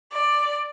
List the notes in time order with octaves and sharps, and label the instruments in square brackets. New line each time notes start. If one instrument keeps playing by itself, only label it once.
[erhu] D5